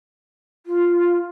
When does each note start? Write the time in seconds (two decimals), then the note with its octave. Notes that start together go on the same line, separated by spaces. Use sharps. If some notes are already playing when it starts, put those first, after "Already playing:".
0.66 F4